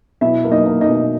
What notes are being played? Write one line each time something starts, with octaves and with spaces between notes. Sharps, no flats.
B2 E4 E5
A#3
D#4 D#5
A#3
D#4 D#5
B2